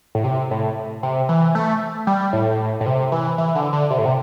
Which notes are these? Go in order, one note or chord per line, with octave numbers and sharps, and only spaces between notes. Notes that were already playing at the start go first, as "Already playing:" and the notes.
A2
C3
A2
C3
E3
A3
G3
A2
A2
C3
E3
E3
D3
D3
C3
A2
C3